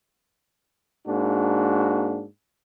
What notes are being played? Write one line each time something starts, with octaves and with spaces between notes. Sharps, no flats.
G#2 A#3 D4 F#4